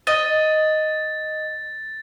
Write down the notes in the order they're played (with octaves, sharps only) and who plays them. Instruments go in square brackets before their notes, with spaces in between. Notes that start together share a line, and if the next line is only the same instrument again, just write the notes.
[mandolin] D#5 [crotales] A6